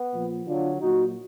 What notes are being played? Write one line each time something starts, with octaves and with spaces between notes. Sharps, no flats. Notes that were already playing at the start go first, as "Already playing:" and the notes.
Already playing: B3
A#2 F3
D3 F#3 D4 F4
A#2 F#3 D#4 F#4